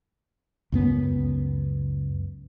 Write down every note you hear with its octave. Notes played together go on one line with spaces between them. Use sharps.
C#2 F#2 B3